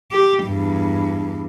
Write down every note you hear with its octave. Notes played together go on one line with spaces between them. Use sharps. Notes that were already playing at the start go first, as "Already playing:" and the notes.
G4
E2 G2